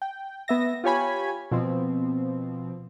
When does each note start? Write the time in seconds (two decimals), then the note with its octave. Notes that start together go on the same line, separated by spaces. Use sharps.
0.02 G5
0.48 B3 E5 A#6
0.84 F4 G4 C#5 G#5 B5
1.51 B2 F3 C4